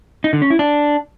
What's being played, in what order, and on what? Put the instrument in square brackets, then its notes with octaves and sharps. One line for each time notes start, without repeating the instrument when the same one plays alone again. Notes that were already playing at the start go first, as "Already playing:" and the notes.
[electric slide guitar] D#4
D3
C#4
E4
D4